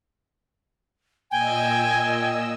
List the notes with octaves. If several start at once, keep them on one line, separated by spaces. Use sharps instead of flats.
A#2 D#5 G5 G#5 E6